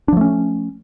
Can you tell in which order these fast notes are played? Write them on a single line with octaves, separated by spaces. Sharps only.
D4 F3 A3 C#4